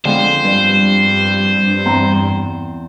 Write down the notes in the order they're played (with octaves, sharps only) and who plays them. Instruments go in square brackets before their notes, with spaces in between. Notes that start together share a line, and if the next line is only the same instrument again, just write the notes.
[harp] F2 G#3 B3 [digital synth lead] D3 [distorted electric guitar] C5
[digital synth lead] G2
[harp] E2 C4 A#5